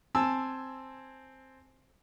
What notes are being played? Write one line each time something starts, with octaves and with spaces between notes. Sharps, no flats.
C4 G#5 A5 E6